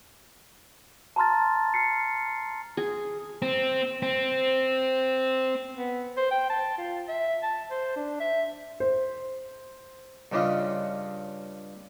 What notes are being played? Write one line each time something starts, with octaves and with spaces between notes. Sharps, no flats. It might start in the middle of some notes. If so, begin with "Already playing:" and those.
A5 A#5 C6 F6 A6
F6 C7 C#7
G#4
C4
C4
B3
C5
G5
A5
F4
E5
A5
C5
D4
E5
C5
G2 C#3 D4 F4 D#5